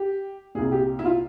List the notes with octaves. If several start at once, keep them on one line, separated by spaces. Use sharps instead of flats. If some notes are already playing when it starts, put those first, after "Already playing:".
Already playing: G4
C2 A#2 G#4
G4
E4
F4